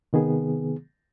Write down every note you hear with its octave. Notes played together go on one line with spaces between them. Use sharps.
C3 D#3 B3 G#4